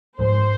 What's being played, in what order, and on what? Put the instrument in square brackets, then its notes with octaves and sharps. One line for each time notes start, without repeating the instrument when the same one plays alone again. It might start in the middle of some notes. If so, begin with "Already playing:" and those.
[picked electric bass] G#2 F3 G#3 [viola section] C5